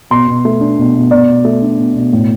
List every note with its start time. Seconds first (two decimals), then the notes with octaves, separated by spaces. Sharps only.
0.11 B2 C6
0.27 B2
0.45 A3
0.61 D4
0.78 B2
0.95 B2
1.11 B2 D5
1.28 B2
1.45 A3
1.62 D4
1.79 B2
1.95 B2
2.13 A2